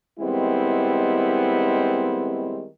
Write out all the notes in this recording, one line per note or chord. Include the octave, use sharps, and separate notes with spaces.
D#3 G3 G#3 B3 C4 E4